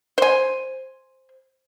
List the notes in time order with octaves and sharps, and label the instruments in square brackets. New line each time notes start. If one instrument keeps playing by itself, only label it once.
[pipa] C5 G#5